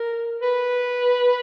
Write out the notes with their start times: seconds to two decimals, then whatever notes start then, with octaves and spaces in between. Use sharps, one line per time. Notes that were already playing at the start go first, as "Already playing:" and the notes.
Already playing: A#4
0.42 B4